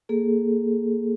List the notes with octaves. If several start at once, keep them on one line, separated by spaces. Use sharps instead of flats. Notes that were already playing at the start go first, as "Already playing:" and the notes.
A#3 G#4 A4